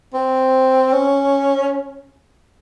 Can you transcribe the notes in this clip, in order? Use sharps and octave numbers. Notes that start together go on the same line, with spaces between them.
C4
C#4